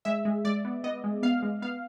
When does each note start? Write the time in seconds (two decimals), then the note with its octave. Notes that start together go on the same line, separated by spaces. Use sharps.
0.05 G#3 E5
0.25 G#3
0.45 G#3 D5
0.65 B3
0.84 B3 D#5
1.04 G#3
1.23 B3 F5
1.43 G#3
1.62 B3 F5